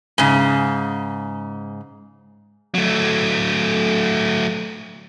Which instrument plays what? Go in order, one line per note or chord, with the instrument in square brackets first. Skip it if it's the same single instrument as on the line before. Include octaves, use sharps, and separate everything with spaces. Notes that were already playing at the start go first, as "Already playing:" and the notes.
[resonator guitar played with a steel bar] G#2 C#3
[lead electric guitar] F#3 A3